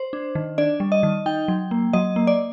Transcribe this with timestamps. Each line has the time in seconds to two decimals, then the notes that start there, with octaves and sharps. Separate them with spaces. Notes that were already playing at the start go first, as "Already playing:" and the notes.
Already playing: C5
0.13 D4
0.35 D#3
0.58 D4 D5
0.80 G3
0.92 D#5
1.03 D#3
1.26 D#4 G5
1.48 F#3
1.71 A#3
1.93 F#3 D#5
2.16 A#3
2.27 D5